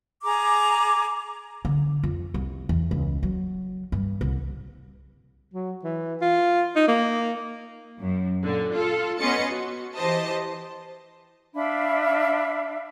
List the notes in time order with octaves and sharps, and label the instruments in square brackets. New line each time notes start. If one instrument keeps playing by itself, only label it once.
[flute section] G#4 A#5 D6
[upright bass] D3
F2
C2
E2
C#2
F#3
G2
C2
[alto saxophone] F#3
E3
F4
D#4
A#3
[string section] F#2
A#2 D3
F4 A4
B3 C#4 D#5 C6 A6 C#7
F#4
E3 G4 C5 D#5 A5
[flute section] D4 E5 F5 B5